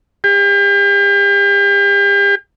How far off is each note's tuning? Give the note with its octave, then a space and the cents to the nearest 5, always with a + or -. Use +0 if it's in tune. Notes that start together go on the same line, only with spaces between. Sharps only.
G4 +40